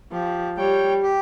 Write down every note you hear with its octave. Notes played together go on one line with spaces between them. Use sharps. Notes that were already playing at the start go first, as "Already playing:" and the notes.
F3 G4
G3 C#5 G5
G4